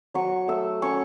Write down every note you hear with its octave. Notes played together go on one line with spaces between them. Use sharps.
F#3 C#6
A3 E6
C#4 C#6